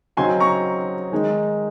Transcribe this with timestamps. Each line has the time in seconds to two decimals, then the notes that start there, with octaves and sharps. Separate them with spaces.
0.17 C#3 F#3 C4 D#4 G#5 C6
0.40 A#5 C#6
1.12 D#3 G#3 D#4